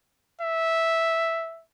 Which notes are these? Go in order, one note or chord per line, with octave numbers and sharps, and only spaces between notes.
E5